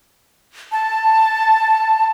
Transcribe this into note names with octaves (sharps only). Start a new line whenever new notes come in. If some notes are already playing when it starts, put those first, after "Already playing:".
A5